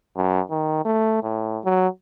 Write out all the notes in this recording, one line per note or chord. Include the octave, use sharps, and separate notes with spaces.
F#2
D#3
A3
A2
F#3